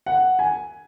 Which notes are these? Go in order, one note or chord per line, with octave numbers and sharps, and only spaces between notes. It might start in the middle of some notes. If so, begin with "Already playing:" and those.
F#5
G#5